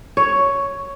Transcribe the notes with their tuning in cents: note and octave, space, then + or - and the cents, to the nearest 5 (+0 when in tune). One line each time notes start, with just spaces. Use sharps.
C#5 +5